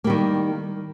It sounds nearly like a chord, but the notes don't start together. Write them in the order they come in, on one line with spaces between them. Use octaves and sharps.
A#3 G3 D#3